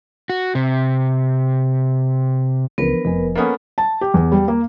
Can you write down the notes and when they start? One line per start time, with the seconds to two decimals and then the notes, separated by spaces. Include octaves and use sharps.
0.30 F#4
0.55 C3
2.78 C#2 E3 F3 B3 D4 A#4 B4
3.05 F1 F3 D#5 G#5
3.35 A#3 B3 C#4 A4 D#6
3.78 A5
4.01 G4
4.14 E2
4.32 G3
4.48 A#3